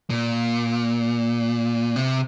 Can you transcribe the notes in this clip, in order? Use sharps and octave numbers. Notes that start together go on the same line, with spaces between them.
A#2
C3